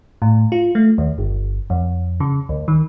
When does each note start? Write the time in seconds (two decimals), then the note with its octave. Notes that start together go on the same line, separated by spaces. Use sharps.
0.22 A2
0.52 F4
0.75 A3
0.98 D#2
1.18 G1
1.70 F2
2.20 C#3
2.49 D2
2.68 D#3